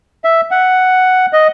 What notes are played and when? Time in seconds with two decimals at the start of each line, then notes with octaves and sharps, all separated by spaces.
0.24 E5
0.51 F#5
1.33 D#5